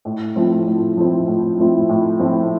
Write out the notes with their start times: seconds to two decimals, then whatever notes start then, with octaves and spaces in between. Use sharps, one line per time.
0.05 A2
0.36 F3 A3 C4 E4
0.66 A2
0.97 F3 A3 C4 E4
1.28 A2
1.58 F3 A3 C4 E4
1.89 A2
2.20 F3 A3 C4 E4